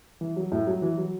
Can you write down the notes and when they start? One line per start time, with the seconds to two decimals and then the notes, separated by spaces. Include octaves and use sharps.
0.21 E3
0.36 F#3
0.52 A2 A3
0.67 F#3
0.82 E3
0.98 F#3